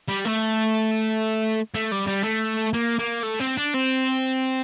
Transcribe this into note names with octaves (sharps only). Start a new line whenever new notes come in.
G3
A3
A3
G3
G3
A3
A#3
A#3
A3
C4
D4
C4